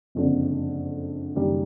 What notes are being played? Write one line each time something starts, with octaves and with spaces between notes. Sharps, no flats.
F#1 F2 D3
F#1 F#2 D#3 G3